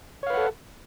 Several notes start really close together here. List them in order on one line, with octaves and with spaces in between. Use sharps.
C#5 F5 B4 F#5 A4